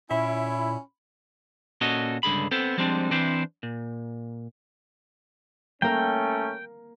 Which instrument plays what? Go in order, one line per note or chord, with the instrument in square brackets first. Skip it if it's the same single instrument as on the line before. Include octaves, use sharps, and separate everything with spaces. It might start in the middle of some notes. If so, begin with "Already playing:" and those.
[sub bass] A#2 [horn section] C#4 E4 [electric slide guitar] E5 [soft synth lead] B5
[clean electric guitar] A#2 C#4 F#4 A4 D#5
C#2 G2 D3 G#4 B5
B3 C4 A4 C5
F3 G3 G#3 C4 D4
E3 C4 D4 E4 C5
A#2
[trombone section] A3 C#4 [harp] A#3 A#4 [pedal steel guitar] G5